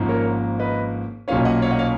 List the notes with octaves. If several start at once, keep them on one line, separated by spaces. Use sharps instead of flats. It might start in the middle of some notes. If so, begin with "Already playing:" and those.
Already playing: G#1 G#2 F3 A#3 C#4
A#4 C#5
B4 D#5
B1 A#2 F#3 A#3 C#4 C#5 F5
D#5 F#5
C#5 F5
D#5 F#5
C#5 F5